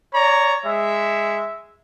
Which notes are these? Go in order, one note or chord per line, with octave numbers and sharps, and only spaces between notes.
C#5 D5 A#5
G#3 E5